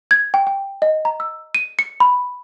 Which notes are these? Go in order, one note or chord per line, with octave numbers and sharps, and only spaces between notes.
G#6
G5
G5
D#5
A#5
E6
D#7
C#7
B5